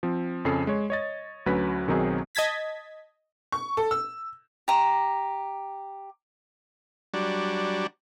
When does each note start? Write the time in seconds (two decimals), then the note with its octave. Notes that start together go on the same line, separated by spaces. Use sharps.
0.03 F3 C4
0.45 F2 C#3 G#4 A4 C7
0.67 G#3 C#5
0.90 C#5 D#5 A6
1.46 D2 F#3 C#4 B4 B6
1.88 B1 D#3 F#3 C4 D#4 G#4
2.35 D#5 A5 G#6 A6 B6
3.52 C#6
3.77 A4
3.91 E6
4.68 G4 A#5
7.14 F#3 G3 D4